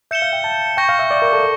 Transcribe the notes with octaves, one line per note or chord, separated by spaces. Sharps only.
E5 G6 C#7 E7 G7
F5
G5
A5
G5 C#6 G6 A#6
F5
E5
D5
A#4
A4